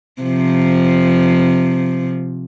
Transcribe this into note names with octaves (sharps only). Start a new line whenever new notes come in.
C3 F3